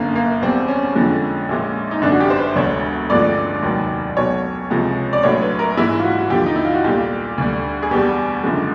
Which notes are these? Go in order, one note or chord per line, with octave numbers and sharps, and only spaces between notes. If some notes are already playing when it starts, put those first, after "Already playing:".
Already playing: G1 F#2 D3 A#3
A#3
E2 B2 G3 C4
C#4
F2 D3 F3 G#3
A#1 A#2 F3 G#3
D#4
G1 F#2 D3 D4
F#4
G4
C5
B4
E1 D2 D3 C#5
A1 G2 D3 F3 G#3 D5
F1 D#2 D#3 F#3
B1 B2 F#3 C#5
C#2 C3 F3 G#3
D5
A#1 A2 F#3 C#5
B4
A#4
A#1 G#2 E3 G#3 E4
F4
F#4
F#4
D#2 D3 F3 G4
D#4
E4
F4
F#4
B1 A#2 G3 G4
D2 D3 G3
G#4
E2 B2 G3 G4
F#1 F#2 D3 F3 G#3